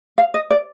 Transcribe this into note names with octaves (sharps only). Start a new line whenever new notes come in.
F5
D#5
D5